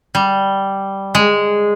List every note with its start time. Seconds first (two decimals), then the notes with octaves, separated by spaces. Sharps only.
0.15 G3
1.15 G#3